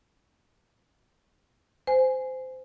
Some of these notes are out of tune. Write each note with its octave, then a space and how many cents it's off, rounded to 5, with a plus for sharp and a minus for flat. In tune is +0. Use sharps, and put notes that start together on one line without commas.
C5 -20 G#5 +0